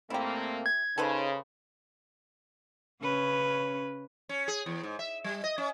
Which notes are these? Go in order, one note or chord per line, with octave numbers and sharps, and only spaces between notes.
A#2 A3 A#3 C4 E4 G4
G#6
C#3 D#4 A4 B4 C5
C#3 C#4 B4
C#4
G#4
E2
G#2
E5
G3
D#5
C#4